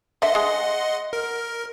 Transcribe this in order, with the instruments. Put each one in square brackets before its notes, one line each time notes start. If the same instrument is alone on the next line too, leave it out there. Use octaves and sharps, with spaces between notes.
[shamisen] D3 E5 [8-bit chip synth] D#5 F#5 C6
[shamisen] G#3 G#4
[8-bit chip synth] A#4